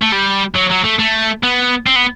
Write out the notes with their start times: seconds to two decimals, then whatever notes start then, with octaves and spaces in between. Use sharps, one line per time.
0.02 A3
0.13 G3
0.56 F#3
0.71 F#3
0.85 A3
1.00 A3
1.43 B3
1.86 C4
1.96 B3